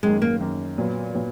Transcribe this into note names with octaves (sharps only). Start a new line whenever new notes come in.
F#2 D#3 G#3 A#3
A#3
F#2 D#3 A#3
A#2 F#3 B3
A#2 F#3 B3